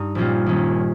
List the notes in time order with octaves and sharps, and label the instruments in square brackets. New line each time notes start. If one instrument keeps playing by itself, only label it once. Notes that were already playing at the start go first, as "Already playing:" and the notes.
Already playing: [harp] G2 D#4
A#1 A#2 G3 C#4 F4
D#2 D#3 G3 C#4